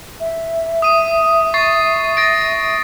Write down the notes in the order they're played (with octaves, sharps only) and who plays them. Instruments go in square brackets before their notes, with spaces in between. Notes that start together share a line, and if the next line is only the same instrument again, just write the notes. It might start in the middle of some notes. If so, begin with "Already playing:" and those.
[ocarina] E5
[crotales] D#6 D#7
C#6 A6 C7
A6 A#6 D7